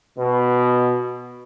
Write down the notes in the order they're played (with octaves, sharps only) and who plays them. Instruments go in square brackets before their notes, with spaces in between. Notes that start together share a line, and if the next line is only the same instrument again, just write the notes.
[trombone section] B2